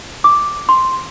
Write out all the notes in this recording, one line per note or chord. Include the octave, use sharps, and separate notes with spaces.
D6
C6